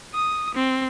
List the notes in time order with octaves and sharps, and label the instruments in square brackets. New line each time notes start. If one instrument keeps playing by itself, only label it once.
[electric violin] D#6
C4